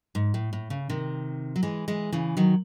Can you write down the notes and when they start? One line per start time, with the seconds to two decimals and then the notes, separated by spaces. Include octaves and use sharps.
0.15 G#2
0.34 A2
0.53 A2
0.70 C#3
0.89 C3 D#3
1.56 F#3
1.63 E3 G#3
1.88 E3 G#3
2.13 C#3 E3
2.37 D#3 F#3